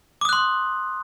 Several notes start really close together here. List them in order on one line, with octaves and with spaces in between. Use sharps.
D6 D#6 F#6 C6